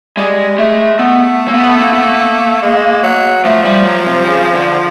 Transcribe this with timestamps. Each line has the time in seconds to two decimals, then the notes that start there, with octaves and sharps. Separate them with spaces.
0.17 G3 G#3
0.58 G#3 A3
0.99 A3 B3
1.48 A#3
1.54 B3
1.80 A#3
1.93 B3
2.03 A#3
2.62 G#3
3.03 F#3
3.44 F3 A3
3.65 G3
3.86 F#3
4.06 C3
4.27 C#3
4.54 D3